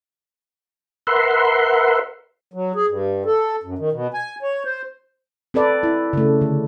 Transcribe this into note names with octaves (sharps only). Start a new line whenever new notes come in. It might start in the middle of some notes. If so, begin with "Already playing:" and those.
A#4 B4 E5 F#5 C6
F#3
G#4
G2
A4
F#2
D#3
B2
G#5
C#5
C5
C4 A4 B4 D5
E4
C#3 A3
D3